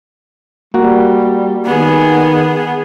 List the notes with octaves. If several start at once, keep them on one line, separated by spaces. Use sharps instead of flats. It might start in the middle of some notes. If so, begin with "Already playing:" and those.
G3 A#3 F#4
D#3 B3 G#4